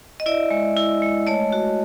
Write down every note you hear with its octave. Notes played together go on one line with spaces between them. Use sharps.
D#5
E4 D5 E5
G#3
E4
G#3
A3 C#5 D#5
F#4